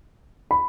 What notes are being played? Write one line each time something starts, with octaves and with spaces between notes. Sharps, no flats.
B5